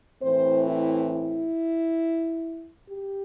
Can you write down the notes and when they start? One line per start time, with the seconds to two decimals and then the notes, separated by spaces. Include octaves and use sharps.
0.22 A2 E3 C4 C5
0.67 E4
1.12 E4
2.90 G4